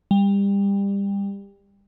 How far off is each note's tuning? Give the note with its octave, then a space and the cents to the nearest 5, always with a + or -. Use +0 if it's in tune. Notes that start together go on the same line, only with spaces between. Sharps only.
G3 +25